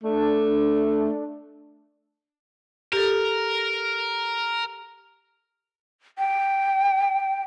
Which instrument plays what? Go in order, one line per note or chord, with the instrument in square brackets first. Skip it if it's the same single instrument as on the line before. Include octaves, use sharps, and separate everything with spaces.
[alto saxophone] A3 [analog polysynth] D4
[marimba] G4 A4 [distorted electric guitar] A#4
[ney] G5